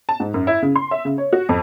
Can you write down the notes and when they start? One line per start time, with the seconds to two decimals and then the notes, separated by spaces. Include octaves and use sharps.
0.09 A5
0.20 G#2
0.34 F#2
0.47 E4
0.62 C#3
0.76 C6
0.91 E5
1.05 C#3
1.18 C#5
1.33 F#4
1.49 F2